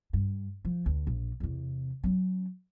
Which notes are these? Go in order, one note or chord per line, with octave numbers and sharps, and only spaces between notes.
G2
F3
D2
A#1
E2 C3
F#3 C#4